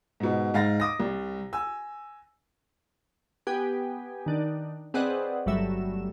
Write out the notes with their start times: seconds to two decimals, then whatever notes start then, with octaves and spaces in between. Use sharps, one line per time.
0.20 G#2 B2
0.54 G#2 F5 A6 A#6
0.80 D6 D#6 A#6
1.00 C2
1.53 G#5 E6
3.47 B3 G4 G#5
4.26 D#3 D4
4.94 C4 G#4 B4 D5 D#5 F#5
5.46 G1 F#3 G3 A3 E5 E7